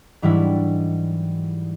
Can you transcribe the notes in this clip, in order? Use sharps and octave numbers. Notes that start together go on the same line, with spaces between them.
G#2 E3 F#3 G3 D4 E4